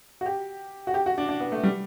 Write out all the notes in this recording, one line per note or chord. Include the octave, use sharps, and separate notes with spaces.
F#4
G4
F#4
G4
F#4
D4
D4
B3
A3
G3